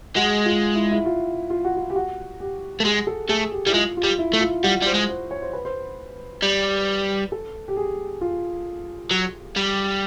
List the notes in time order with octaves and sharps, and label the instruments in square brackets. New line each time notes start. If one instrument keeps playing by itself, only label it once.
[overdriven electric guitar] G#3 [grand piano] F#4
[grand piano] F4
E4
E4
F4
F4
F#4
F4
G4
F#4
G4
[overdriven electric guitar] A3
[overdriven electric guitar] G#3 [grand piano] G#4
[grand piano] A4
[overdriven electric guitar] A3 [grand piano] G#4
[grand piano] G4
[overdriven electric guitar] G3 [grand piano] E4
[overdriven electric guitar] G#3 [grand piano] F4
[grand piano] F4
[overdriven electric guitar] G3
[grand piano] E4
[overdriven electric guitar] A3
[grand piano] F4
[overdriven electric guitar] G3 [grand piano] F#4
[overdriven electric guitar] G3 [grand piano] C5
[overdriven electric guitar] G#3
[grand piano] C5
C#5
C5
B4
C5
[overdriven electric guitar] G3
[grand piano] A4
G4
G#4
F4
[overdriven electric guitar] F#3
G3